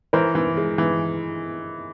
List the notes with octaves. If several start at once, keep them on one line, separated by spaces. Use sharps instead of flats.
E3 A#4 C5
E3
G#3
E3